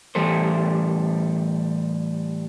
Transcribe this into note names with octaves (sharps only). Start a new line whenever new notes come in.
A2 E3 G3 A4 C5